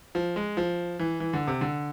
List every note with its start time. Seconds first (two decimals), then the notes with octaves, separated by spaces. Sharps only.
0.15 F3
0.36 G#3
0.57 F3
0.99 E3
1.20 E3
1.33 D3
1.47 C3
1.61 D3